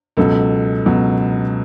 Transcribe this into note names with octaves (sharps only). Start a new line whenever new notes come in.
C#2 B2 F#3 A4
C#2 B2 F#3